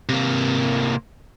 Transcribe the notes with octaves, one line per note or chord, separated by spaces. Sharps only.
C3 A#3